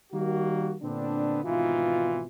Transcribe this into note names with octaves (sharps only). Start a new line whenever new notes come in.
D#3 G3 A#3 F#4
A#2 D3 B3 C4 D4
G#1 B2 E3 D#4 F4